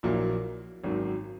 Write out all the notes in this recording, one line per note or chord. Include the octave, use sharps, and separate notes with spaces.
A#1 A#2 F#3 A#3 E4
G#1 F#2 D#3 F#3